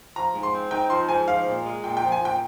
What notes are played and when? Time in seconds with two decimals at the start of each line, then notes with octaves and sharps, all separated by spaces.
0.16 F3 A#5
0.34 G#2
0.43 C6
0.53 C4
0.71 D#4 G5
0.90 F3 C6
1.08 G#2 G#5
1.27 F3 F5
1.46 A#2
1.64 G#3
1.83 A#2 G5
1.97 G5
2.02 F3
2.12 G#5
2.21 A#2 G5